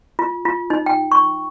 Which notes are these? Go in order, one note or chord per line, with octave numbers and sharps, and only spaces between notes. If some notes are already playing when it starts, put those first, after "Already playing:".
F4
F4
D#4
G5
C#6